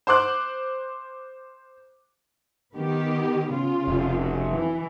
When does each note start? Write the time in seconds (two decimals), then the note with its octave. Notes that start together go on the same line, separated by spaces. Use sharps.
0.07 C5 C6 D6 F#6
2.75 D#3 B3 G4
3.50 C#3 F4
3.88 F1
4.21 F#4
4.52 E3